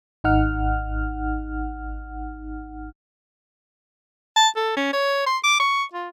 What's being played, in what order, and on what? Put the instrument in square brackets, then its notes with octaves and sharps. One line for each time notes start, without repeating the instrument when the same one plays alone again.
[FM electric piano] G#1 D#4 F#5 F6
[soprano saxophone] A5
A4
C#4
C#5
C6
D6
C#6
F4